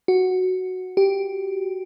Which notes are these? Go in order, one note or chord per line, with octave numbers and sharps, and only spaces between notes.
F#4
G4